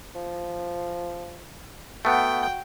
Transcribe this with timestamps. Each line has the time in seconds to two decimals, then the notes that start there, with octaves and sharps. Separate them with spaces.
0.15 F3
2.05 A3 B3 F#4 G5